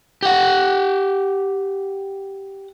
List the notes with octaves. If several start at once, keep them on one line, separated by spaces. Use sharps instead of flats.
G4 F#5